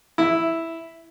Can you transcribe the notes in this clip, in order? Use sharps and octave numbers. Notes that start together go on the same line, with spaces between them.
E4